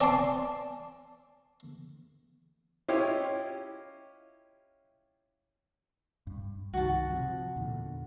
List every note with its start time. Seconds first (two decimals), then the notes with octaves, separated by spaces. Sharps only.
0.01 D5 G#5 A5 C6 D6
2.88 C#4 E4 F4 G4 D#5 F5
6.27 G2
6.74 C2 G2 D#3 F#4 A5
7.10 C3 F3
7.56 E2 A#2 D3